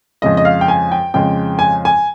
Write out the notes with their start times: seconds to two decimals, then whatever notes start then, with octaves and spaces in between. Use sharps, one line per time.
0.22 F2 C#3 G#3 D#5
0.37 D#5
0.45 F5
0.61 G5
0.68 G#5
0.92 G5
1.14 F2 C#3 G#3 G5
1.59 G#5
1.85 G#5